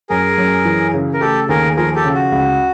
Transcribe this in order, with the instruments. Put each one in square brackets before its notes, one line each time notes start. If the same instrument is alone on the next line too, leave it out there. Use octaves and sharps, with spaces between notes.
[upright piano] F#2 [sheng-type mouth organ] G#4 A#4
[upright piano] F#2
E3
C#3
[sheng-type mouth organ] A#4
[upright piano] A3 [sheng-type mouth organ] G4 A4
[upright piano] D#2 [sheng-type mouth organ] G#4 A#4
[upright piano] F3 [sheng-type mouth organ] G#4 A#4
[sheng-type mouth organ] G4 A4
[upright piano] C#3
[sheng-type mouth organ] F#4
[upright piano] C#2